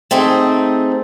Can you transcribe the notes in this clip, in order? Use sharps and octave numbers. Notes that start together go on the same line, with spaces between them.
A3 C4 D#4 G#4